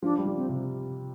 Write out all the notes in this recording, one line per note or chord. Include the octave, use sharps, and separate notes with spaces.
F3 D4
G3
F3
C4
C3